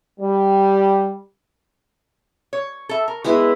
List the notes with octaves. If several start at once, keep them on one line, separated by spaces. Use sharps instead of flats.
G3
C#5
A4 E5
A#4
G#3 B3 E4 F#4